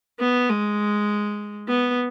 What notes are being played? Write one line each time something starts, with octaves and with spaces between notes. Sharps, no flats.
B3
G#3
B3